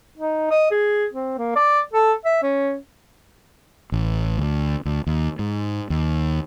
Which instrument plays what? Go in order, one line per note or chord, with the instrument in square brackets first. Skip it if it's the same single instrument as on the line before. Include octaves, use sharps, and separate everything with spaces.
[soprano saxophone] D#4
D#5
G#4
C4
A#3
D5
A4
E5
C#4
[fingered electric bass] A1
D2
D2
D#2
G#2
D#2